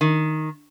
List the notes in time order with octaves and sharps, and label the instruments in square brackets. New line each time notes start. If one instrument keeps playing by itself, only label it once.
[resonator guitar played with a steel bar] D#3